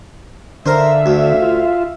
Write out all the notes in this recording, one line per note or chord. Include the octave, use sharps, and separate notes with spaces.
D3 A#4 C5 E5 F5
D2
F4